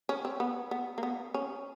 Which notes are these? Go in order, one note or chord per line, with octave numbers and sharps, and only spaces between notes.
C#4
C4
B3
B3
A#3
B3
C#4